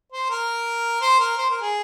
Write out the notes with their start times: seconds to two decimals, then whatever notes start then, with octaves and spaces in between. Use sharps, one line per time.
0.12 C5
0.30 A#4
1.01 C5
1.20 A#4
1.38 C5
1.50 A#4
1.61 G#4